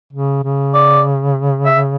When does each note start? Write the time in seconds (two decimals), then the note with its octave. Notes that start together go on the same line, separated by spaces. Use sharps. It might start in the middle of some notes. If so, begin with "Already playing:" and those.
0.13 C#3
0.43 C#3
0.74 D5
1.66 E5